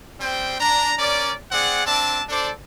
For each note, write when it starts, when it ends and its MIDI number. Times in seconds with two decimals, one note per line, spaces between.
0.21 0.55 55
0.21 0.55 60
0.21 0.55 72
0.21 0.55 79
0.60 0.93 62
0.60 0.93 82
0.99 1.33 61
0.99 1.33 70
0.99 1.33 74
1.52 1.85 60
1.52 1.85 68
1.52 1.85 74
1.52 1.85 78
1.86 2.22 60
1.86 2.22 62
1.86 2.22 74
1.86 2.22 76
1.86 2.22 81
2.29 2.51 62
2.29 2.51 69
2.29 2.51 72
2.29 2.51 74